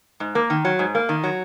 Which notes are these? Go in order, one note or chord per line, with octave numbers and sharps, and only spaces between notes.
G#2
A#3
D#3
F#3
G#2
A#3
D#3
F#3